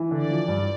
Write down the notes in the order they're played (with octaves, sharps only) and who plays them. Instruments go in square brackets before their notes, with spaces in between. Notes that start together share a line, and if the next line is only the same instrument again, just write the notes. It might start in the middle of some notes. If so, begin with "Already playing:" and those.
Already playing: [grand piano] E3
[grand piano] D3 [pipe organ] D5
[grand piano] F3
G2